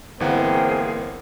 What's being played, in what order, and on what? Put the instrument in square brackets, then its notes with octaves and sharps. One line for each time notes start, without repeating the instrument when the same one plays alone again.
[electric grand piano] G1 E3 F#5 [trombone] A#3 [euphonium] C4 [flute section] G#4 G5